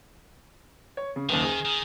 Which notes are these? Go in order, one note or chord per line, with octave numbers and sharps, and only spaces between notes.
C#5
C#3
F#1 D#2 D#3
G#4
D#3